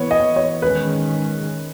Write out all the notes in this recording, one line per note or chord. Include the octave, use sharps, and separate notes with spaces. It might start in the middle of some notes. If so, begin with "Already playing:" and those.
Already playing: E3 B3 C#5
D#5
C#5
D#3 G#3 C#4 B4